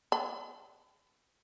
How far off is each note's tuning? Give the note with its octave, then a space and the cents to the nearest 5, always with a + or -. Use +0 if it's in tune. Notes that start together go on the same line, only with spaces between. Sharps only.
B5 +40